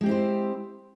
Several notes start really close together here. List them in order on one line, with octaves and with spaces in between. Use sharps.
G#3 G4 C4 E4 C5